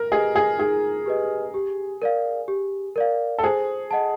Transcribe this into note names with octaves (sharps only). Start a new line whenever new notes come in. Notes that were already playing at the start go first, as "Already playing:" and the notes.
Already playing: A#4
G4 G#4 B4 D#5
G#4
D#4 G#4
G4 B4 D#5
G4
A#4 D5 F5
G4
A#4 D5 F5
A4
G#4 C5
D#5 F#5 A5